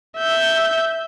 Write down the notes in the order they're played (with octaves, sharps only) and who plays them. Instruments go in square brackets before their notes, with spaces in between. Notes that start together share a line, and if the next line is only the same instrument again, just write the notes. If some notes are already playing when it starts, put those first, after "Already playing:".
[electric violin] E5 G6